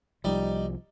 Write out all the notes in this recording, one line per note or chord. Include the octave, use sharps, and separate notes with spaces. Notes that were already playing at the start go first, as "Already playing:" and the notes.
C2 F3 G3 D#4